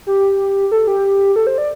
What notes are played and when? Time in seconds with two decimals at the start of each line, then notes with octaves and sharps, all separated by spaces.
0.07 G4
0.71 A4
0.87 G4
1.36 A4
1.47 C5
1.58 D5